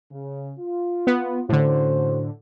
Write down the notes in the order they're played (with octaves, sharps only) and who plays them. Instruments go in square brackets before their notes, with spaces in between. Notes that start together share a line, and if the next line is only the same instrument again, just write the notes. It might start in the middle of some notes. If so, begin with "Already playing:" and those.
[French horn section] C#3
F4
[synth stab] B3
[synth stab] A2 D3 [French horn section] C#4 F#4 C5